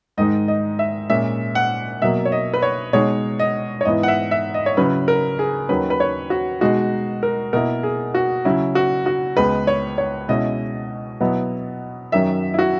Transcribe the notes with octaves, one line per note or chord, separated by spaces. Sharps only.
G#2 D#3 G#3 D#4 D#5
D#5
E5
A#2 G#3 C#4 E5
F#5
B2 F#3 A#3 E5
C#5
D#5
B4
C#5
B2 G#3 D#4 C#5
D#5
C#5
G#2 E3 B3 E4 D#5
F#5
E5
E5
D#5
C#5
C#3 F#3 C#4 E4 B4
A#4
G#4
D#2 D#3 F#3 C#4 B4
B4
C#5
F#4
B2 G#3 D#4 F#4
A#4
B2 A#3 E4 A#4
G#4
F#4
C#3 F#3 C#4 E4
F#4
F#4
C#2 C#3 G#3 B3 B4
C#5
C#5
B2 G#3 C#4 E4 D#5
B2 F#3 B3 E4
F#2 D#3 F#3 C#4 E5
E4
F#4